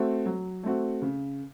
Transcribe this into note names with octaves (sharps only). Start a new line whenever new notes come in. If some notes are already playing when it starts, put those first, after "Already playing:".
Already playing: A3 C4 F#4
F#3
A3 C4 F#4
C#3